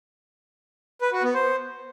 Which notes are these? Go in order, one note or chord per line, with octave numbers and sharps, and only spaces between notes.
B4
F#4
B3
C5